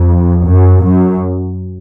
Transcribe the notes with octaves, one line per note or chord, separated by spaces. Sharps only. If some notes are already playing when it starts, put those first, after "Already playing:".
Already playing: F2
F#2
F#2